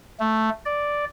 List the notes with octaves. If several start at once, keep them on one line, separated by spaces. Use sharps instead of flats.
A3
D5